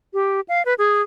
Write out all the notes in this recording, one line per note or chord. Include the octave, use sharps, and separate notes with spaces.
G4
F5
B4
G#4